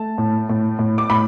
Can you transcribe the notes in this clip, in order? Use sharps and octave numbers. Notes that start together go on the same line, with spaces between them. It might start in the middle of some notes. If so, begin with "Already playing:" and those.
Already playing: A3 A5
A2
A2
A2
D6
A2 B5